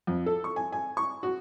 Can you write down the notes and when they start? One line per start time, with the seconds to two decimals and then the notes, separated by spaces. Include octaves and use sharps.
0.07 F2
0.26 A4
0.44 C#6
0.56 G#5
0.72 G#5
0.97 C#6
1.23 F#4